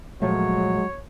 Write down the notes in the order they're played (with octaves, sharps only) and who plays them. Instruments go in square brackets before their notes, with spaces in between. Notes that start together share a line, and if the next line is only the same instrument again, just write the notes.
[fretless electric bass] A#2 F3 A3 [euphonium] F#3 [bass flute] G#3 [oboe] C#5